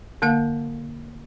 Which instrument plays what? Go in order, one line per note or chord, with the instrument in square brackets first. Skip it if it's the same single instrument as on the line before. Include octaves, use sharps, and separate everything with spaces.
[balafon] D3 A#3 F5